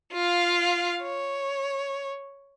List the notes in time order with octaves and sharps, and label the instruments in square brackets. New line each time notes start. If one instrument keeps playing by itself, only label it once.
[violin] F4 F5
C#5